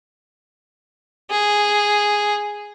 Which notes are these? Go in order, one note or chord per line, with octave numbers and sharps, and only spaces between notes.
G#4